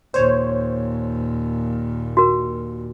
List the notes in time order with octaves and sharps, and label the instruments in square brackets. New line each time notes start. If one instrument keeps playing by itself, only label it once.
[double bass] D#2 A#2 [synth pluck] C5 C#5
[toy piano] F#4 A#4